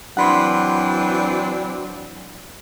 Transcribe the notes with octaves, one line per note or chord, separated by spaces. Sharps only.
E3 F#3 C4 D4 F#5 B5 C6